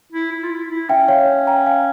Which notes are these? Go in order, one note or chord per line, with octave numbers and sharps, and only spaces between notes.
E4
E4
F4
E4
E4
C#4 E5 G5
C#5 F5
G5 A#5
F5 G#5